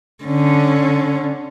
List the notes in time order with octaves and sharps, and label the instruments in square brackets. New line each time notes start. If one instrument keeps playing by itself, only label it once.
[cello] D3 C#4